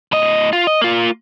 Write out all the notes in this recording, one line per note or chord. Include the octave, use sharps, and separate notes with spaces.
A2 D#5
F4
D#5
A#3 F4